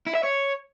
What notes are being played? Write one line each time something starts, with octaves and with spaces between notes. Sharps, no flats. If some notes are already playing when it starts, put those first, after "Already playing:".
E4
E5
C#5